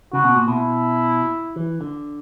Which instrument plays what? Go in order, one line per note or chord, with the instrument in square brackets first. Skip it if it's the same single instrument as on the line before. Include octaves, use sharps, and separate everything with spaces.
[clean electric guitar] C#3 [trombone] F#4
[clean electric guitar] B2
A#2
[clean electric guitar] B2 [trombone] E4
[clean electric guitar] E3
D3